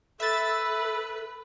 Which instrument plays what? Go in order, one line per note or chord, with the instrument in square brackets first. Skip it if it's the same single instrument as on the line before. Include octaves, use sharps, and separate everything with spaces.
[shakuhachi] A4 [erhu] B4 [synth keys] E5 A6